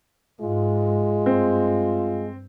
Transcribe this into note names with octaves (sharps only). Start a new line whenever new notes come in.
G#2 G#3 F4
G2 C4